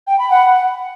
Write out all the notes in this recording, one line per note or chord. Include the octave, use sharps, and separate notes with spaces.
G5
B5
F#5